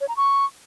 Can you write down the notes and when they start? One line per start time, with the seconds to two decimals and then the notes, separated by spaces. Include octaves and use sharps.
0.01 C#5
0.09 A#5
0.17 C#6